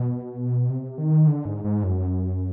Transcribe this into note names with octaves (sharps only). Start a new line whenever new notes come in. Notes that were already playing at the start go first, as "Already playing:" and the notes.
Already playing: B2
C3
D#3
D3
G#2
G#2
F#2